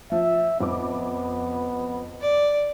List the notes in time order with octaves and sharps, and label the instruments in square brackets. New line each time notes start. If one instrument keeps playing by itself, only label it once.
[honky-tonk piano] F3 [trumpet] E5
[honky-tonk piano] F2 D6 [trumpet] B3
[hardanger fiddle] D5